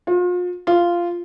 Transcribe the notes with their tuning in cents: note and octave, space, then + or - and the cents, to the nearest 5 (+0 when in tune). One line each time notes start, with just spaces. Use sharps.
F4 +40
F4 -10